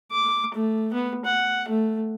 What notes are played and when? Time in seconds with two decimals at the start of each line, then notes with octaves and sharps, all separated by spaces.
0.12 D6
0.54 A3
0.93 B3
1.25 F#5
1.69 A3